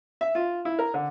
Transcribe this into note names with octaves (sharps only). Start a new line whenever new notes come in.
E5
F4
E4
A#4
D3